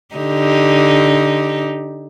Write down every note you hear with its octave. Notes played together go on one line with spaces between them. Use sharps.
D3 D#4 G4